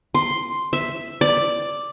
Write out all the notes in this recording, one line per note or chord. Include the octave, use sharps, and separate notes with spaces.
C6
E5
D5